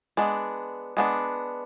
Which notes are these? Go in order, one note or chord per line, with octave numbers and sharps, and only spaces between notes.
G#3 B3 D4
G#3 B3 D4